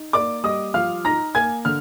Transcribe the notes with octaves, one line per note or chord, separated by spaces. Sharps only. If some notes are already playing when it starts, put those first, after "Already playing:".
Already playing: D#4
A#3 D5 D6
G3 D#5 D#6
F3 F5 F6
D#4 A#5 A#6
A#3 G#5 G#6
D3 F6